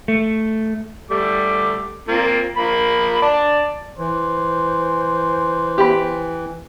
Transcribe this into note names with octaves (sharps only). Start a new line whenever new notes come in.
A3
G3 A3 D6
A#3 C4 F4
F3 A#3 B5
D5 A5
E3 C5
G4 B5